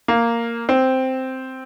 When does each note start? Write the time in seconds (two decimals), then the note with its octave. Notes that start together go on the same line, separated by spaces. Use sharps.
0.08 A#3
0.69 C4